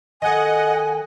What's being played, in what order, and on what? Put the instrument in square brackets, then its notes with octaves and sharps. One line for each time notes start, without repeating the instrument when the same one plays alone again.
[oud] D#3 A4 [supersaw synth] D#5 F#5 [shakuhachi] G#5